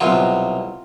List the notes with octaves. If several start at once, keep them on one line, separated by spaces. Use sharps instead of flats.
C2 B2 F#3 F4